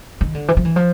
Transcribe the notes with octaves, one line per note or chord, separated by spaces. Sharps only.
D#3
D3
E3
F3
E3
F3